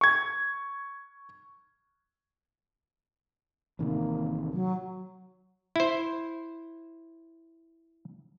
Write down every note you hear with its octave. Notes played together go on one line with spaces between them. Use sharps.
C#6 G#6
A1 C3 D#3 A#3
F#3
E4 C5